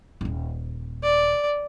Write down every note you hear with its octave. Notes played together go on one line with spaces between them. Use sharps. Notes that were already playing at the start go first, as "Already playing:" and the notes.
D#1 G#1
D5